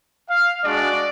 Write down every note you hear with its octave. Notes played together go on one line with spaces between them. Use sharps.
F5
G#3 D4 F#4 D5